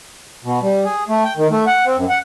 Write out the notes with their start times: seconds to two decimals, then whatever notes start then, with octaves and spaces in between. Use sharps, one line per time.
0.45 B2
0.62 G3
0.85 G#4
1.09 A3
1.24 G5
1.37 D#3
1.51 A3
1.67 F#5
1.85 C4
1.97 F#2
2.09 F#5